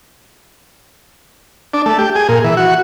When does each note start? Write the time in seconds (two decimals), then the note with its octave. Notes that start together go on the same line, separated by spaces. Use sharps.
1.74 D4
1.86 A3
1.99 G4
2.16 G#4
2.29 A#2
2.44 E3
2.57 F#4